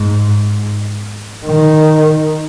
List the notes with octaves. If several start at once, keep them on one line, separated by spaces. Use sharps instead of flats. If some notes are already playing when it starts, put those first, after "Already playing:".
Already playing: G#2
D#3